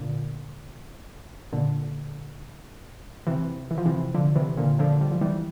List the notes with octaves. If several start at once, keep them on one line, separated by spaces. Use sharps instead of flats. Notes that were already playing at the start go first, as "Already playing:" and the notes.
Already playing: A#2 D3
A#2 D3
C3 E3
E3
F3
C3 E3
D3 F3
C3 E3
A#2 D3
D3 F3
G3
F3
E3 G3